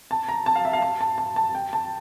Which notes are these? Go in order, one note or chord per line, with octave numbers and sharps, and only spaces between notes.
A5
A#5
A5
F5
E5
F5
A5
A5
A5
A5
G5
A5